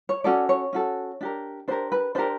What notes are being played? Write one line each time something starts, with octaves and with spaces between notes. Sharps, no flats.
C#5
C#4 F#4 A4 D5
C#5
C#4 F#4 A4
D4 G4 A#4
D4 G4 A#4 C5
B4
D4 G4 A#4 C5